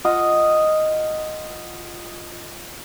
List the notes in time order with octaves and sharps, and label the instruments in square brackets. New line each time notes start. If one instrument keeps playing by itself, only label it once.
[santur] F4 D#5 F#5